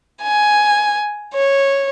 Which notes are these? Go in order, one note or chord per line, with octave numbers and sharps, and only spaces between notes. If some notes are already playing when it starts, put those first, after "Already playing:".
G#5
C#5